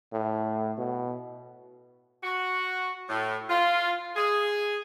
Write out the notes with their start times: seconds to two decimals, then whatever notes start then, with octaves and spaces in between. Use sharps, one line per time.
0.12 A2
0.77 B2
2.24 F#4
3.09 A2
3.49 F4
4.16 G#4